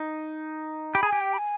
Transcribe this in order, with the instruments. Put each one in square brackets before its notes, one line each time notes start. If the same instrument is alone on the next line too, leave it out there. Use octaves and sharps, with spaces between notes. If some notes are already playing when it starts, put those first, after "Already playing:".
Already playing: [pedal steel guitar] D#4
[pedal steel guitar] G4 [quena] B5
[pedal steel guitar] G#4 [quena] G#5
[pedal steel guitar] G4
[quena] G5
B5
G#5